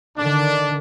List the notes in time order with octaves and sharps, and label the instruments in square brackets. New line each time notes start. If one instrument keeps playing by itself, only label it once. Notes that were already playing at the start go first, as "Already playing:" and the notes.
[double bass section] D3 D#3 [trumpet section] D4